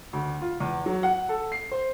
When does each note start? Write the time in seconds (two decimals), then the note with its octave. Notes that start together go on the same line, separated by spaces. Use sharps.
0.13 D2
0.41 F4
0.60 E2
0.86 F#3
1.03 F#5
1.29 A4
1.52 C7
1.72 C5